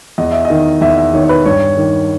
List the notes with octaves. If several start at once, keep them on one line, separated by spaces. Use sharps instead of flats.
E2 D#5
E5
D#5
D#3
E2 E5
E5
D#3 C#5
C#5
B4
G2 C#5
D#3